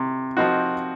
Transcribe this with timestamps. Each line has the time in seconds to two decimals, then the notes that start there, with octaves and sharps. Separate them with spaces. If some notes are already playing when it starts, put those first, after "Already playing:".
Already playing: C3
0.37 F3 C4 D#4 F#4